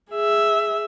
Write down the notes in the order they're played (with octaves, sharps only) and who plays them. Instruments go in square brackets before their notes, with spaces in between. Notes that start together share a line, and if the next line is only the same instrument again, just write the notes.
[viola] G#4 E5